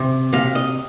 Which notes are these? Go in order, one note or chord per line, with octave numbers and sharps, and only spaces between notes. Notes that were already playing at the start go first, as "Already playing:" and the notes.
Already playing: C3
C3 F5
D#5